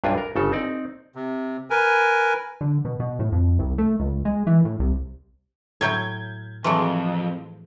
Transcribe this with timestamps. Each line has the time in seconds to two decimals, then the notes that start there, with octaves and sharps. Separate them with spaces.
0.04 B1 G2 D4 F4 B4 G#5
0.18 A#4
0.36 G1 C#3 A4
0.52 C4 D#4 D5
1.15 C3
1.70 A#4 B4 G#5
2.61 D3
2.85 B2
3.00 B2
3.19 A2
3.32 F2
3.59 C2
3.78 A3
4.00 C#2
4.25 G#3
4.47 E3
4.65 A2
4.79 C2
5.81 A2 F#3 E4 G6 G#6
6.64 F2 E3 F#3 A3 G#4 C6